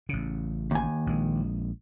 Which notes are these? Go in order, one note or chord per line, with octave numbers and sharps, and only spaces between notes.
A1 C#3
D#2 G#5
A#1 G#3